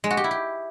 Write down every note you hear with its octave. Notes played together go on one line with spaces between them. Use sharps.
G#3
F#4
G4
E4
G4